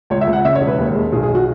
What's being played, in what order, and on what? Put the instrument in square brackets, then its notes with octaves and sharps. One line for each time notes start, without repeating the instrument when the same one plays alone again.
[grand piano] C#2 C#5
E5
C#2
F#5
C#3 E5
C#5
E1
B4
D#2
G#3
B1 G#4
G#4
B1
F#4